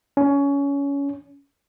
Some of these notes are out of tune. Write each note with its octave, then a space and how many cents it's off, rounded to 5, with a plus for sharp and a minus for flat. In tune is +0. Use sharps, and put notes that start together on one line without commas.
C#4 +20